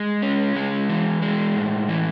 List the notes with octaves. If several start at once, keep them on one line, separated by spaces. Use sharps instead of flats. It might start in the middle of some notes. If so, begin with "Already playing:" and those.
Already playing: G#3
C#4
G#3
E3
G#3
A2
E3